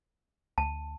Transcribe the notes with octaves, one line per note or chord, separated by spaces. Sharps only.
D2 A5